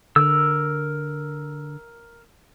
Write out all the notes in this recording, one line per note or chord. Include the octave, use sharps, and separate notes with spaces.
D3 A#4 E6